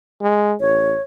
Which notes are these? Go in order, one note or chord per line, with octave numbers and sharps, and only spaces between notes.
G#3
A1 C#5